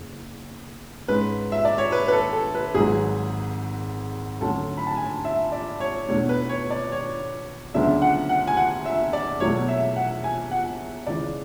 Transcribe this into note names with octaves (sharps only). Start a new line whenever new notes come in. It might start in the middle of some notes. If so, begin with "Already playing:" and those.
Already playing: F#1 E2
G#2 G#3 C#4 B4
E5
D5
C#5
B4
B4
A4
A4
B4
G#1 G#2 F#3 G#4
D2 D3 F#3 A3 C#4 A4
B5
A5
G#5
E5
D5
C#5
E2 B2 A3 D4 C#5
B4
C#5
D5
C#5
D2 C#3 F#3 B3 D4 E5
F#5
F#5
G#5
F#5
E5
D5
E1 E2 B2 F#3 A3 C#5
E5
F#5
G#5
F#5
C#2 C#3 E3 D5